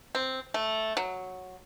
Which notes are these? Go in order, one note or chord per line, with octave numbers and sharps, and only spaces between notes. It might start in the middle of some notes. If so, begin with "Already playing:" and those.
C4
A3
F#3